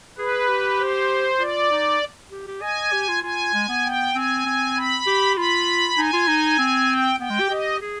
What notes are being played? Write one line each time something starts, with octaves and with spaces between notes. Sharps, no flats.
G#4 B4
G4
C5
F4 D5
D#4
G4
G4
D#5 G#5
G4
F4
F4 G#5
G#3
B3
G5
C4 G#5
C4
B5
G4
F4 B5
D#4 G#5
F4
D#4
C4
G5
B3 G5
G#3
G4
G4 D#5
G#4